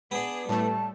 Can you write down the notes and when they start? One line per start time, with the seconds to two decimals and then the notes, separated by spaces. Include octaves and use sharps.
0.11 B3 D4 G#4
0.49 A2 G3 A3 A5